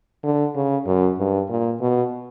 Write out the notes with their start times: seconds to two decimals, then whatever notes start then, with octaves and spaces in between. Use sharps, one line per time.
0.24 D3
0.55 C#3
0.86 F#2
1.19 G2
1.49 A#2
1.81 B2